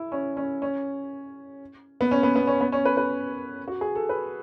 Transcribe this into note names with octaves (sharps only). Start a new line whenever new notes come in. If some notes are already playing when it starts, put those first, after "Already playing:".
Already playing: E4
C#4
C#4
C#4
B3
C#4
B3
B3
C#4
B3
C#4
B4
B4
F#4
G#4
A4
B4